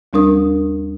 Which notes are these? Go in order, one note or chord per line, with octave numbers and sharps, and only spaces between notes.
D#2 G3 D4 A#4 D#6